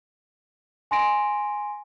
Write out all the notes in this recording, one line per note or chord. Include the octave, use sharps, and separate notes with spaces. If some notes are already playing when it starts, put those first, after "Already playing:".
G#5 C6 A#6 D7